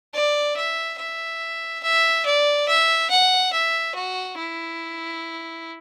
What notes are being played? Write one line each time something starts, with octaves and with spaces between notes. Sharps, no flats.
D5
E5
E5
E5
D5
E5
F#5
E5
F#4
E4